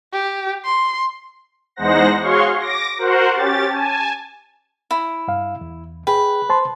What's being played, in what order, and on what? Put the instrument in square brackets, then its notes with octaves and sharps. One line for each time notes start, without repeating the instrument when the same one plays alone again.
[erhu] G4
C6
[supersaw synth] E2 G#3 D#4 C5 F#5 A#6
F#4 G#4 C#5 F5 C6 C#6
D6 A#6
F#4 A#4 C5 F#5
C#4 G4 A6
G#5 A5
[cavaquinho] E4
[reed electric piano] G2 F5
E2
[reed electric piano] G#4 G5 [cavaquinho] B4
[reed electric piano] C5 A5 C6